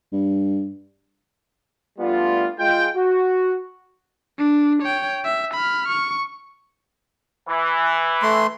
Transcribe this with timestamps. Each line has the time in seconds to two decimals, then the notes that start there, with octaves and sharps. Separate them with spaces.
0.12 G2
1.99 G3 A3 B3 D4 F4
2.59 G#3 F4 G5
2.95 F#4
4.39 D4
4.82 C#5 G5
5.25 E5
5.54 B5 F6
5.88 C#6
7.47 E3
8.23 A3 C6